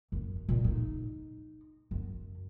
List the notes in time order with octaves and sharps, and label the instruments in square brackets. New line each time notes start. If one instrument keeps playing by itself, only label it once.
[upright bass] F#2
A#2
D#4
F#2